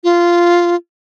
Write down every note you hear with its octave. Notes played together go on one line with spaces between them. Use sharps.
F4